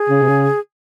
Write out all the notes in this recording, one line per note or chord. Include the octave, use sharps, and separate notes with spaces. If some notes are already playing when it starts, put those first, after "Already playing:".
Already playing: G#4
C#3
C3
C#3